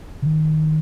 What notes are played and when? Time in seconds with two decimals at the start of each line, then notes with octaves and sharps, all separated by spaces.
0.22 C#3
0.26 D#3